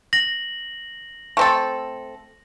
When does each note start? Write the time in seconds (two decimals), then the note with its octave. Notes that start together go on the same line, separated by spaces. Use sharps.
0.13 A#6 F#7
1.37 A3 C4 A4